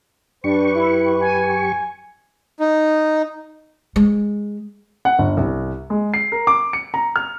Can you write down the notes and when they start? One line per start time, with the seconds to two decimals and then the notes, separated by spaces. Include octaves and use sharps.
0.44 F#2 D4 G4 B4 C#6
0.75 E4
1.21 G#5
2.60 D#4
3.96 G#3
5.05 F#5
5.18 G1
5.37 C2
5.90 G#3
6.14 C7
6.32 A#4
6.47 D6
6.73 C#7
6.94 A#5
7.16 F6